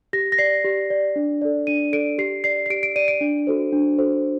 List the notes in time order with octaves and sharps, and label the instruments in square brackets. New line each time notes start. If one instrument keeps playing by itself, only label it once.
[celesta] G4 A#6
A#6
D5 C7
G4
D5
D4
A4 D5
D4 D#7
A4 D5 D7
G4 C7
D5 C7
C7
G4 D7
D7
D5 D#7
D7
D4
F#4 A4 C5
D4
F#4 A4 C5